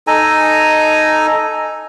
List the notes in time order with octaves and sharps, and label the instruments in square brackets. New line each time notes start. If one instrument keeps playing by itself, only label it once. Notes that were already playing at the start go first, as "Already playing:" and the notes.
[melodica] D#4 A4 G#5 A#5